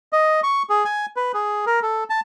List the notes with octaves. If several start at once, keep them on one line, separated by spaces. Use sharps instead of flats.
D#5
C#6
G#4
G#5
B4
G#4
A#4
A4
A5